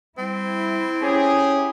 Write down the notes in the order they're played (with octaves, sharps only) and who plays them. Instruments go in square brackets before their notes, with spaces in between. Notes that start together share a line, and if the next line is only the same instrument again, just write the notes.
[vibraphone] G3 [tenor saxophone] C4 [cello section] E4
[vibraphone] C#4 C#5 [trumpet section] G4 G#4